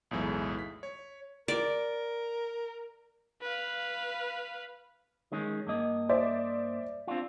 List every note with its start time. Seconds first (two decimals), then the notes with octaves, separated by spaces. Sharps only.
0.11 B1 E2 A2 E3 G#3
0.59 B6
0.83 C#5
1.48 A#4 D5
3.42 B4 F5
5.32 D#3 G#3 C#4
5.67 G2 A#3 D#5
6.09 C5 D5 E5
7.07 C4 D4 F4